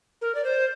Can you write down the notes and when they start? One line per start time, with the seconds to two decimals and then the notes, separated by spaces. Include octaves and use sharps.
0.22 A#4
0.35 D5
0.44 C5